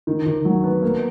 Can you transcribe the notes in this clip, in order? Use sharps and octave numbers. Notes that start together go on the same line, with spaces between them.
D#3
D#3
F#3
B3
A#3